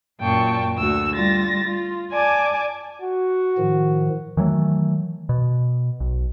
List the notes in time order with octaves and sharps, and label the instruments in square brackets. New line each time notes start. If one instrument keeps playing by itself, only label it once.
[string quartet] F#2 A#2 G5 A5 C#6
D2 F#4 E6
G3 F4 A6 A#6
F4
D5 G#5 A5 D6
[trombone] F#4
[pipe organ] A2 D#3 F3
[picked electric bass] D#3 E3 F#3 A3
B2
B1